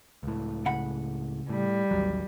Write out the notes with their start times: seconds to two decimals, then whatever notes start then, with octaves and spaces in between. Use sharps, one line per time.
0.23 C#2 A2
0.66 C#3 F#5 B5
1.49 A2 G3
1.91 A1 D#2 F#3